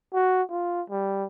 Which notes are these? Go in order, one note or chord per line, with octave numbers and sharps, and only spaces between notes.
F#4
F4
G3